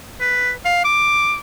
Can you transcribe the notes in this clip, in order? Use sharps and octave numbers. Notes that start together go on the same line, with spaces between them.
B4
F5
D6